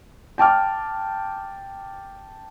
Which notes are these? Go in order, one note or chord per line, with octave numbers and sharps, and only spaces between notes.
G5 A5 D6 F6